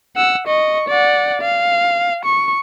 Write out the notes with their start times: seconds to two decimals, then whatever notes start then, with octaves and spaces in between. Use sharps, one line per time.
0.16 F#5 E6
0.47 D#5 C#6
0.89 D5 F#5
1.41 F5
2.25 C#6